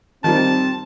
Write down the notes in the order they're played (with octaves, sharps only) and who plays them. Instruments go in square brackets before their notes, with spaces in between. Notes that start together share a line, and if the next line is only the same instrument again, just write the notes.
[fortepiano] D#3 F3 G3 [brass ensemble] C4 [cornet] A5